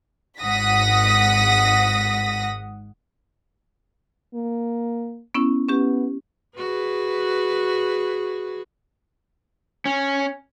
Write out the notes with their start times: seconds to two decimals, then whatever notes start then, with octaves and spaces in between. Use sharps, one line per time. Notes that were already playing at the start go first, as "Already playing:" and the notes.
0.40 G#1 G#2 F#5 D#6 A#6 B6
4.34 A#3
5.35 B3 C#4 E4
5.69 B3 C#4 G4
6.57 F#4 G#4 B4
9.85 C#4